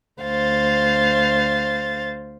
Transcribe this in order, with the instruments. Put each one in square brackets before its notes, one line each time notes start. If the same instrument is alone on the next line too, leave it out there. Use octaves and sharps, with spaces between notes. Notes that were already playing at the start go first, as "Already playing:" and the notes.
[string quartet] D2 C5 F5 A6